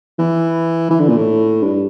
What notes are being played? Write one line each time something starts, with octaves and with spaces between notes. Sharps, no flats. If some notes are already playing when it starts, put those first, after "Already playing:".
E3
E3
D3
A#2
A2
G2